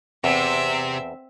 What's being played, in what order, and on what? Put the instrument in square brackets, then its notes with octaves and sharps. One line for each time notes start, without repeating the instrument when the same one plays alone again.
[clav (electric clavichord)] E2 [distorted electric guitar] C3 [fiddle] C4 [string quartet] E5